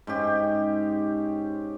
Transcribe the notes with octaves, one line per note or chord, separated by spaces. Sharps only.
G#2 C#4 G4